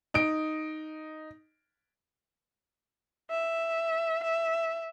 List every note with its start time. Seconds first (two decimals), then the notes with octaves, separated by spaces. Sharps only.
0.14 D#4 D7
3.30 E5
4.24 E5